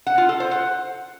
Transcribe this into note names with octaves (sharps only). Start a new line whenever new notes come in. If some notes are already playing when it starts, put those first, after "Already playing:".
F#5
F4
A4
C5
F#5